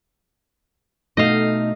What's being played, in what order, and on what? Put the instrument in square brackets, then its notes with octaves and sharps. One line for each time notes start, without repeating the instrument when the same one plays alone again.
[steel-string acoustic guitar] B2 A3 D#4 [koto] D#5 F5